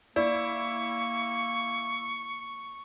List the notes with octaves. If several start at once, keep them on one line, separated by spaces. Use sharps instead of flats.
A#3 E4 D5 C#6